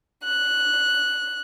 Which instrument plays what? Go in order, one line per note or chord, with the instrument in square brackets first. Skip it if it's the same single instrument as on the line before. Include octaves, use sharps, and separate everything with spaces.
[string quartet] F#6